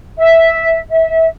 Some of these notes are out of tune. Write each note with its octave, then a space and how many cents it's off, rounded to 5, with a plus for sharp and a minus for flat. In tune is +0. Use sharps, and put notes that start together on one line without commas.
E5 -5
E5 -25